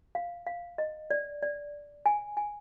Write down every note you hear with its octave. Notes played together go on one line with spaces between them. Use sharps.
F5
F5
D#5
D5
D5
G#5
G#5